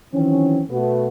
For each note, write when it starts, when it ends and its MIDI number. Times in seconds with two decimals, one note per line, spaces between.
0.12 0.60 51
0.12 0.60 52
0.12 0.60 54
0.12 0.60 60
0.12 0.60 61
0.70 1.08 47
0.70 1.08 57
0.70 1.08 59
0.70 1.08 66